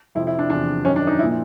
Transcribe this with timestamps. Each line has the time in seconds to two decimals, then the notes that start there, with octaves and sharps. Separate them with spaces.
0.15 F2 C3 F3 E4
0.27 E4
0.39 D4
0.50 E2 C3 F3 D4
0.84 F#2 D#3 C#4
0.96 D4
1.07 D#4
1.19 F3 E4
1.24 A#2